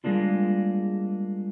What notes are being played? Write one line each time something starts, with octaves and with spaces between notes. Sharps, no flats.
G3 G#3 A#3 D4 F4